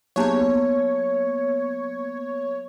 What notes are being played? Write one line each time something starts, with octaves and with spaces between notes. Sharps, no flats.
F#3 A#3 B3 C#5